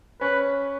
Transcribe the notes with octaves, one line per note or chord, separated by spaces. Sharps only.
C#4 B4